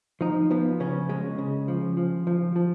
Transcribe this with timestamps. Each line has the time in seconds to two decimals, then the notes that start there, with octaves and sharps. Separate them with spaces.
0.21 F3 D#4
0.50 F3 B3
0.80 C#3 C#4
1.09 G#3 C#4
1.38 C#3
1.68 F3
1.97 F3
2.27 F3
2.56 F3